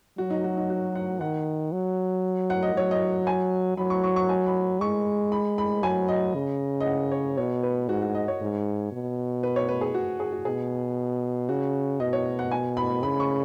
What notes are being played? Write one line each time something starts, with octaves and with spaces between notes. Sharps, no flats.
F#3 F#4
D#4
F#4
D#4
F#4
F#5
D#3 F#5
F#3
F#5
D#5
F#3 C#5
D#5
G#5
F#3 B5
C#6
C#6
C#6
G#5
B5
G#3 C#6
B5
B5
F#3 G#5
D#5
C#3
D#5
F#5
C#5
B2 C#5
B4
G#2 F#4
F#4
D#5
C#5
G#2
B2
B4
C#5
B4
G#4
F#4
G#4
F#4
B2 G#4
C#3 F#4
B2 D#5
C#5
F#5
G#5
B5
C#3 B5
C#6